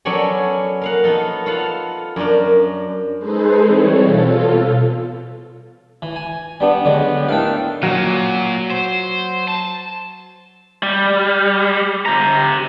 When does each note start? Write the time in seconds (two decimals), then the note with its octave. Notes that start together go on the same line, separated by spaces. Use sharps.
0.05 F#3 B3 C#4 A4 D5 G#5
0.81 A#4 F5 F#5
1.04 B3 D#4 A4 D#5
1.46 F4 A4 F5 F#5 A5
2.16 F#2 D4 A#4
3.17 G#3 D#4 G#4 A4 B4 C5
3.62 E3 G3 C4 C#5
3.98 B2 F4 A4
6.02 E3
6.16 G#5
6.60 G3 B3 D4 G4
6.85 D3 F#3 G#3
7.29 A2 D#3 D4 F5 G5
7.83 A#2 F#3
8.71 C5
9.48 A5
10.83 G3
12.06 G4 A#5